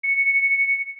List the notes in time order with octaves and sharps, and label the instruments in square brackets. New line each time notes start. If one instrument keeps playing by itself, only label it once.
[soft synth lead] C#7